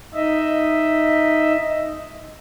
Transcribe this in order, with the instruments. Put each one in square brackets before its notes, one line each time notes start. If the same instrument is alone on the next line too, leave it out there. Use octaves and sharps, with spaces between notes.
[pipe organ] D#4 D#5 E5